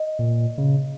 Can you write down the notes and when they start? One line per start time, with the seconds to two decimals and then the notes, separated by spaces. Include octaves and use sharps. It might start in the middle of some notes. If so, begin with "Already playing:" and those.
Already playing: D#5
0.19 A#2
0.58 C#3